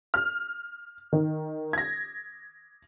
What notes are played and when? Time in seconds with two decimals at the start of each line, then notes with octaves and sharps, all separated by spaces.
0.14 F6
1.13 D#3
1.73 G#6 A#6